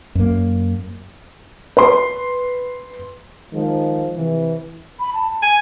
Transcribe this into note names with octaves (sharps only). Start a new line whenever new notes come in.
F#2 A#3
B4 C6
D#3 F3 G#3
C3 E3
B5
A5
G#5